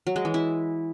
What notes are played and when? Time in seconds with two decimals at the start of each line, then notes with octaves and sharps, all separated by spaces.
0.07 F#3
0.16 G#3
0.25 E3
0.34 E4